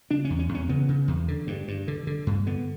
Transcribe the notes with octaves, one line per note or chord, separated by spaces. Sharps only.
C#3 D4
C#4
E2
C#4
E2
C#4
C#3 B3
C#3
E2
D3
G2
G2
D3
D3
G2
D3 B3